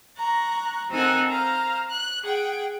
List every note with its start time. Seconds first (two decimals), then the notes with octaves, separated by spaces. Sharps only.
0.17 A#5 C#6 F#6
0.90 C4 D#4 A4 A#4 F#5 G#5
1.29 C5 F5 A#5
1.89 F#6
2.23 G#4 F#5 G5